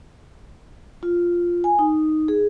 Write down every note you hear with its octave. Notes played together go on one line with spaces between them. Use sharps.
F4
G#5
D#4
G#4